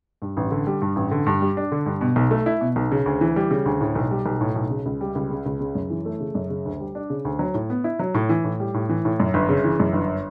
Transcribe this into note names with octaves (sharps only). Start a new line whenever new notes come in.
G2
A1
D3
G3
G2
A1
D3
G2
G3
D4
D3
G2
B2
B1
A3
E4
B2
B1
C#3
D2
E3
G3
C#3
D2
A2
B1
G3
B1
A2
B1
C#3
C#2
G3
C#2
C#3
C#2
C#3
F#2
E3
A3
C#3
F#2
C#3
D2
G3
D4
C#3
D2
F#3
A2
B3
E4
F#3
A2
E3
A2
G3
A2
E3
A2
F#2
G1
C#3
E3
F#2
G1